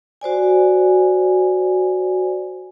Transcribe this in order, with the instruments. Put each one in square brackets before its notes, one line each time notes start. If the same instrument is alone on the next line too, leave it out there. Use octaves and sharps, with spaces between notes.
[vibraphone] F#4 C5 D5 G#5